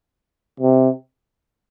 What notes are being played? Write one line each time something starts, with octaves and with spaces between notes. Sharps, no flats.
C3